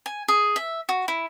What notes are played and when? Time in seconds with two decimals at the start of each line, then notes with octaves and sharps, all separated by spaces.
0.06 G#5
0.28 G#4
0.56 E5
0.89 F#4
1.08 E4